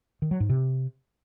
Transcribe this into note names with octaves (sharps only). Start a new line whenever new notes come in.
D#3
F#3
G#2
C3